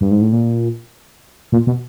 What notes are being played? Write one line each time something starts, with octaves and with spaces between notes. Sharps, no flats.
G2
G#2
A2
A#2
A#2
B2